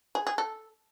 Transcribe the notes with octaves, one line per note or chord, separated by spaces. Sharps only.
G#4
G#4
A4